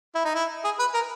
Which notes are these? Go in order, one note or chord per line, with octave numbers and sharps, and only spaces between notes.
E4
D#4
E4
G#4
B4
A#4